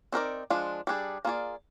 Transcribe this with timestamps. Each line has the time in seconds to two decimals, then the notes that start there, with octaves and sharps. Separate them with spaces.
0.12 C4 D#4 A#4 D5
0.50 F3 G#3 D4
0.87 G3 D4 G#4
1.25 A#3 F4 G#4 D5